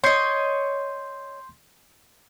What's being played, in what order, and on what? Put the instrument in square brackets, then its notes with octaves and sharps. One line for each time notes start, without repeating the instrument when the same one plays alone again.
[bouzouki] C#5 D#5 [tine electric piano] C6 G6 C7